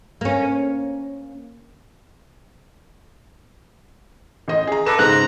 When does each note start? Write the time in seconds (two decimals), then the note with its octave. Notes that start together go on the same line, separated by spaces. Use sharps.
0.21 A#3 C#4
4.48 A1 D#5
4.67 G#4 A#5
4.86 A4 B4 D6 A#6 E7
4.99 G#2 C#3 C5 A#5 F#6